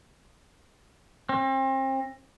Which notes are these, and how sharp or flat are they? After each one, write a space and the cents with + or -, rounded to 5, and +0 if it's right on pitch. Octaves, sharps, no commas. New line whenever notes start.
C4 +35